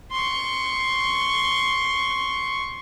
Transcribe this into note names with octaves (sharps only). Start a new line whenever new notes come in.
C6 C#6